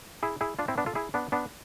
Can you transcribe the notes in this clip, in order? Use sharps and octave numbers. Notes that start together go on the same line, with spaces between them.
E4 G#4
E4 G#4
D4 F4
C4 E4
B3 D4
F4 A4
E4 G#4
B3 D4
B3 D4